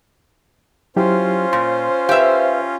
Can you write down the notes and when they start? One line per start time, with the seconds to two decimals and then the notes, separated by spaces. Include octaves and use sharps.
0.96 F#3 C#4 E4 F4 G4 C5
1.53 A#2 C6
2.09 G4 B4 E5 F5